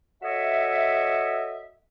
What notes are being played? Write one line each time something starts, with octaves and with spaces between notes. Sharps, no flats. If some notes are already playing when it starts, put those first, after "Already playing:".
F#4 A4 C#5 D#5 E5